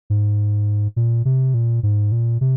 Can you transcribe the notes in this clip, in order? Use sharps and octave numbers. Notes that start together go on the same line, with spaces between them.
G#2
A#2
C3
A#2
G#2
A#2
C3